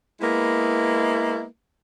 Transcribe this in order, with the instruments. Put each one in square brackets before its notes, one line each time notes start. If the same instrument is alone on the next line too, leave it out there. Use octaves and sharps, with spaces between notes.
[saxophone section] G#3 A#3 B3 E4